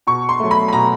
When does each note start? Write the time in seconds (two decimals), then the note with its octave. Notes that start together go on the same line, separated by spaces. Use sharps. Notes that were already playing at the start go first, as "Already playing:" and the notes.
0.07 B2 C#6
0.29 C6
0.40 F#3 A3
0.51 B5
0.68 B5
0.73 B2 A#5